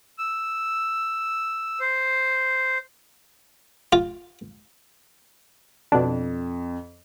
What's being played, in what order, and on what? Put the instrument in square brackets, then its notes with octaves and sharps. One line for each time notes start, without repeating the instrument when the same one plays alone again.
[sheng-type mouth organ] E6
C5
[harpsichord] F4
[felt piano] F2 [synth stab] B2 D4